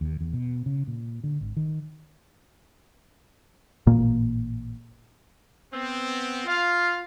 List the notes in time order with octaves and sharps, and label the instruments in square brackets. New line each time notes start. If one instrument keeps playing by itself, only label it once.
[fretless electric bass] D#2
E2
B2
C#3
A#2
D3
G#1
D#3
[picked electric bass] A1 A#2 A#3
[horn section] B3 C4
[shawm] F4 [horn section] F5